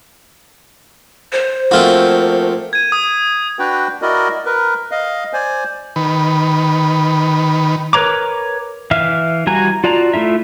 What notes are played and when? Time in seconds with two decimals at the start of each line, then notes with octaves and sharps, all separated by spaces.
1.32 C5
1.71 F3 A3 A#3 C4 F4 F#4
2.73 G#6 D#7
2.92 D#6
3.59 D4 F#4 B4 G5
4.02 E4 F#4 A#4 D5 D#5
4.45 A#4 B4
4.91 D#5 F5
5.33 C5 D5 G#5
5.96 D#3 B4
7.93 A#4 B4 C#5 A#5 D6
8.91 E3 E5 F5 F6
9.47 E3 G3 F#4 G#5 A#5
9.84 F4 F#4 D5 A5 A#5
10.14 A3 E4 F4 E5